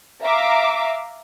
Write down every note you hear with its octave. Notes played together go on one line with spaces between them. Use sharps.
E5 F5 A#5 D6